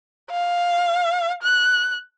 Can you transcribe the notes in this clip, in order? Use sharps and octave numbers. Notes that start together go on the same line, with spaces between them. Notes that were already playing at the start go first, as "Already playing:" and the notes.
F5
F#6